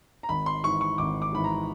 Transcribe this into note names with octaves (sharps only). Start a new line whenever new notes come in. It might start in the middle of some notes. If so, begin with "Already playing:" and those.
A#5
G#1 B5
C6
G#2 E3 C#6
C#6
G#1 D6
D6
G#2 E3 B5
A#5